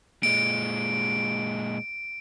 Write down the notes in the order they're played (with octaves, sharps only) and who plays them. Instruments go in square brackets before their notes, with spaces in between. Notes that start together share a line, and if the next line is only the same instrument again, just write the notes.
[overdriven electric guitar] A#2 G#3 [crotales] D7